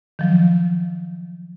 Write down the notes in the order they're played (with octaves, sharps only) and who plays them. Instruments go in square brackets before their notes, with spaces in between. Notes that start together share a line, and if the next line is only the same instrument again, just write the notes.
[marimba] D#3 F3 F#3